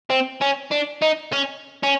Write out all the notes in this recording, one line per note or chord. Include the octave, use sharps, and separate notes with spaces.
C4
C#4
D4
D#4
C#4
C#4